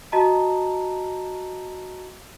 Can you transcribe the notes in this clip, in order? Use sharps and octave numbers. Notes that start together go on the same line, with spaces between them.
F#4 D#5 A5 A#5